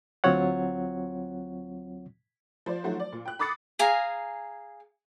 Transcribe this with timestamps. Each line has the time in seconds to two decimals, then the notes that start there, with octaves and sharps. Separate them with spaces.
0.24 D2 F#3 C4 F4 C#5 F#5
2.66 F3 C5 D5
2.84 D#3 F3 F#3 A3 F#4 C5
3.00 D5
3.12 A#2
3.25 G5 F#6
3.39 B5 D6 D#6 A6 C7 C#7
3.79 G#4 F5 G#5 A#5